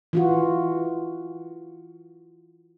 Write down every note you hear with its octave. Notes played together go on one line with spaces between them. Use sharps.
E3 F4 F#4